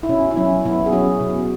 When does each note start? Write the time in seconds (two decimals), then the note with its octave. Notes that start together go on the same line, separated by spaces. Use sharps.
0.03 E4
0.09 B2 C#4
0.31 E4
0.37 F#3 C#4
0.65 B2 B3 E4
0.86 G#4
0.92 F#3 C#4 F#4
1.20 B2